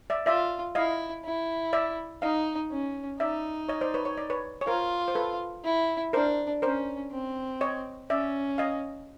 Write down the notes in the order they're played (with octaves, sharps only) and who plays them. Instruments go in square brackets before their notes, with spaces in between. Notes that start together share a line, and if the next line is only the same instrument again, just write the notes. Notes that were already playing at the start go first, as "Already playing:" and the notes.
[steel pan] D5 E5
[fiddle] F4 [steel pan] D5 E5
[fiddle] E4 [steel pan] D#5 F5
[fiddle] E4
[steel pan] D5 E5
[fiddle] D#4 [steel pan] D#5 F5
[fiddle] C#4
[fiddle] D#4 [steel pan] D5 E5
[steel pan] C#5 D#5
C5 D5
B4 C#5
C#5
D5
B4 C#5
C#5
[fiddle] F4 [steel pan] A#4 C5
[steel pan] C5
A4 B4
[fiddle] E4
[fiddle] D4 [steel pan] A#4 C5
[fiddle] C#4 [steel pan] A#4 C5
[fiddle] C4
[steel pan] C#5 D#5
[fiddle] C#4 [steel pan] D5 E5
[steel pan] D#5 F5